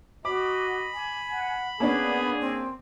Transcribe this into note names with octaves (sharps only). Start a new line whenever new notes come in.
F#4 D#5 B5 D6
G#5
F#5
A#3 B3 C#4 D4 G#4
C4